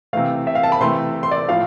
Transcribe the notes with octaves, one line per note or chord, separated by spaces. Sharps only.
C3 E3 A3 F5
E5
F5
A5
B5
C3 E3 A3 C6
C6
D5
A2 F3 A3 F5